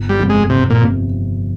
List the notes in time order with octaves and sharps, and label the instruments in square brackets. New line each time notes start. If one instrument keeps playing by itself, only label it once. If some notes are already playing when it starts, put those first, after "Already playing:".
Already playing: [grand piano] G1
[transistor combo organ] G3
[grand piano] F2 C3 F3
[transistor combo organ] G#3
[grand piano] G1 [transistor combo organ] C3
[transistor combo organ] A#2
[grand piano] C3 F3